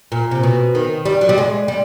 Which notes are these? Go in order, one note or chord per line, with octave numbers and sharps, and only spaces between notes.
A#2
C3
B2
D#3
G3
F#3
G3
G#3
G3